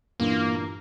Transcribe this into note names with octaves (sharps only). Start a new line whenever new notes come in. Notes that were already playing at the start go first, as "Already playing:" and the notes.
G2 A#2 E3 A#3